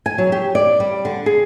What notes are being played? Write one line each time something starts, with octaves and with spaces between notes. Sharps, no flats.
G#5
F#3
G4
D5
G3
D3
G#4